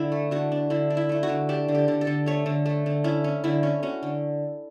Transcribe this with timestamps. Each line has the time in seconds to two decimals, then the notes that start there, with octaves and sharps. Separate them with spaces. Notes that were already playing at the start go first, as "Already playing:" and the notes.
Already playing: D3 E4
0.12 A3
0.31 D3 F#4
0.52 D4
0.70 D3 E4
0.90 D4
0.97 E4
1.09 A3 E4
1.23 F#4
1.29 D3
1.49 D4 G4
1.68 D3
1.75 G4
1.88 D3
2.01 A4
2.07 D3
2.26 A3 C#5
2.46 D3
2.66 A3
2.86 D3
3.04 C#4 E4
3.24 C#4
3.44 D3 E4
3.63 C#4
3.83 C#4 F#4
4.03 D3